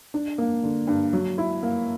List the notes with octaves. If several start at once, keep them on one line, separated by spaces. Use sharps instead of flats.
D4
A#3
D3
G2
F#3
E4
A#3